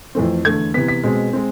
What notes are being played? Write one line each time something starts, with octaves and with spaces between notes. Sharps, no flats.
F2 E3 A3 C4
E2 D3 A3 G#6
C3 E3 B3 B6
B6
B2 G#3 C4
G#3 C4